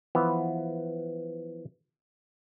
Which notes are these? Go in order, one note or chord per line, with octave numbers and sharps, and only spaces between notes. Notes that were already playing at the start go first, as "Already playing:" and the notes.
E3 F3 B3